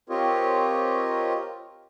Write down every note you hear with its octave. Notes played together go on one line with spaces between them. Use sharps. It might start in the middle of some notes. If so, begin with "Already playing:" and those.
C4 F4 G4 A#4 C#5 D#5